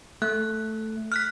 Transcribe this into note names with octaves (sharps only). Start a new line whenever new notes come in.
A3 F#6
F6 F#6 B6